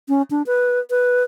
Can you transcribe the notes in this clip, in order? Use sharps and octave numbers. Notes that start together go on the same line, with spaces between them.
C#4
D4
B4
B4